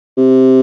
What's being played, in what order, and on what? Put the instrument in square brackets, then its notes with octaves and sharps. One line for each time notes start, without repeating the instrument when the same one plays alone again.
[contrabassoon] C3